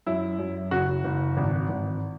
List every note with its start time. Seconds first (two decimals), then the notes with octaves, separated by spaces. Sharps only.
0.06 F#2 E4
0.39 F#2
0.71 F#1 F#4
1.04 F#1
1.37 G#1
1.69 G#1